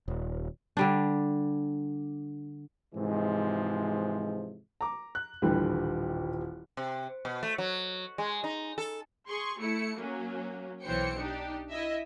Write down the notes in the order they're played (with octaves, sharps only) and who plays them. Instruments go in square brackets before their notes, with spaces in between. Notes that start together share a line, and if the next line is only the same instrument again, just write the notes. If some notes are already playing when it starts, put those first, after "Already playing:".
[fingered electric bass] D#1
[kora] D3 G3 D4
[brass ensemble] G#2 C3 E3 F3 G#3
[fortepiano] A#5 D6
[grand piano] F#6
[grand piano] D#1 A1 G5 [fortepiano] D3 E3 G3
[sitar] C3
B2
A3
F#3
G#3
D#4
A4
[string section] G#4 C6 C#6
A3 E4 C#7
F#3 A#3 C#4
B1 E3 C5 C#5 G5 C#7
D4 D#4 G4
E4 D#5 E5